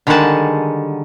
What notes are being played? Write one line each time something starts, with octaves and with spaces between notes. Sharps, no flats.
D3 D#3 G3 G#3 F#5 A5